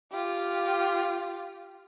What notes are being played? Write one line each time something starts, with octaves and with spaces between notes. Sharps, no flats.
F4 G4